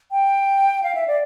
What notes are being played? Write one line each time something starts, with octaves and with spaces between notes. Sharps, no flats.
G5
F5
E5
D5